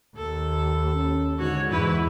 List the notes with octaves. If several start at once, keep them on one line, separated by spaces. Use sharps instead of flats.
D#2 A4
C#4
G#2 D3 F#4 C#5
E2 G#2 E3 E4 B4